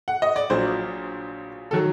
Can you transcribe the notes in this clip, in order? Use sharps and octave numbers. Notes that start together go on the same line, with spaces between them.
F#5
D#5
D5
A#1 A#2 F#3 C5
D#3 F#3 A4